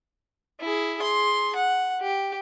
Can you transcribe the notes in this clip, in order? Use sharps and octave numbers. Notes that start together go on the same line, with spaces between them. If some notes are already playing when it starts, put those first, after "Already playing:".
E4 G#4
G#4 C6
F#5
G4